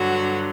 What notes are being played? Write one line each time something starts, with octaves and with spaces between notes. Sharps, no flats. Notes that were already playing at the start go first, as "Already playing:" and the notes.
Already playing: G2 D3 F#3 F#4